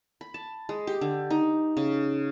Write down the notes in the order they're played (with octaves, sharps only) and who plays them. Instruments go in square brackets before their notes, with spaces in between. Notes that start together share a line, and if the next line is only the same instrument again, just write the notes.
[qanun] B5
A5
G#3
G4
D3
D#4
C#3